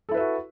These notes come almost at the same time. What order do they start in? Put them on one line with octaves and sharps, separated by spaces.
A4 E4 B4 E5 F#4